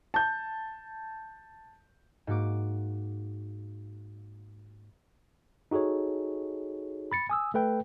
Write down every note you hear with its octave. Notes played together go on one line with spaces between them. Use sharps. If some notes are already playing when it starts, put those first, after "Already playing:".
A5 G6
G#2 A#3 F#4 D6
D#4 F#4 G#4 A4 C#5
B5 A6 C#7
G#5 D#6 E6
A3 A4 B4 G5